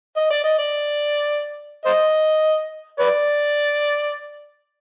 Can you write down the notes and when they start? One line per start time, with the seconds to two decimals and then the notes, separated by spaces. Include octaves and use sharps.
0.16 D#5
0.31 D5
0.44 D#5
0.59 D5
1.86 C5 D#5
3.00 B4 D5